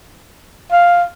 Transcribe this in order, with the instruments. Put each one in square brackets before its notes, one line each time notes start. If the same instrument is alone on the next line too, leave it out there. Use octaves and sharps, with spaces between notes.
[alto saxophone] F5